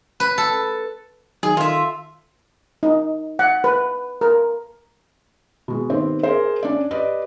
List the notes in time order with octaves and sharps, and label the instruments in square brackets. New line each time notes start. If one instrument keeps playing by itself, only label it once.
[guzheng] B4
A4
[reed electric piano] D#3 F#3 D#4 [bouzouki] G#4
[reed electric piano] D#3 A4 [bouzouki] F4 E5
[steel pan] D#4
F#5
B4
A#4
[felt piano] B2 G#3
D#3 B3 C4 G4 C5
G#4 A#4 C5
C#4 D4 D5
G4 B4 D5 D#5